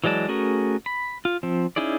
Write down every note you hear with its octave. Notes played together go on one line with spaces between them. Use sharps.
E3 F#3 G#3 D5 A5
A3 C#4 F#4 G#4 A#4
B5
F4
F3 C4
C#4 D#4 E4 G#4 D5